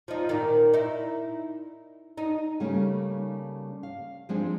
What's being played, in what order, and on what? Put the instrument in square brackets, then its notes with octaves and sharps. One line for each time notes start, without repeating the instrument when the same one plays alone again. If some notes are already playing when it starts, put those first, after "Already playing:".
[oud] F3 D#4
A#2 D#3
D#4 E4
D#4
[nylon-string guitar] C#3 G3 A3 A#3 C#4 D#4
F5
F3 G#3 C4 D4 D#4 G#4